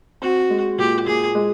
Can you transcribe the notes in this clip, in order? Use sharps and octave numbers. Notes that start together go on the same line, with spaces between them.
C4 F#4
G#3
A#2 G4
A#2 G#4
G#3